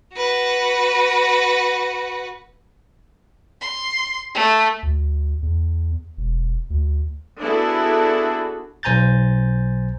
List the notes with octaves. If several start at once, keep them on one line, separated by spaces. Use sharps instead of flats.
F#4 B4
C6
A3
D2
E2
E1
D2
B3 D4 E4 F#4 G#4 A4
B1 C5 G#5 A#5 G6 A6